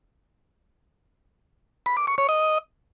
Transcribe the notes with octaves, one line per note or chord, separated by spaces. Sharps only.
B5
D6
C#6
C#5
D#5